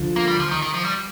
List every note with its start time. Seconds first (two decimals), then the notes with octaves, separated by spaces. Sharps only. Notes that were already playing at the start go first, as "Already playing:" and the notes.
Already playing: D2 D3 F3
0.16 A#3
0.28 G3
0.40 F3
0.51 D#3
0.62 D#3
0.74 F3
0.85 G3